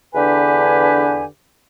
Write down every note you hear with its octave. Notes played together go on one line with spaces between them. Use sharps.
E2 D3 D4 G4 B4 G#5